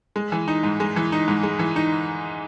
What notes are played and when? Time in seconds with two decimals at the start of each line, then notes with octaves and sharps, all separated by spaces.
0.16 G#3
0.32 E3
0.48 D#4
0.63 G#2
0.80 G#3
0.96 E3
1.12 D#4
1.28 G#2
1.43 G#3
1.59 E3
1.76 D#4